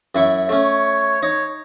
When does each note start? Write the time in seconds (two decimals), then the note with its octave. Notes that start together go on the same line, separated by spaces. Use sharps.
0.15 F#2 E4 C#6
0.49 A3 C#4 C#5
1.23 D#4 C#5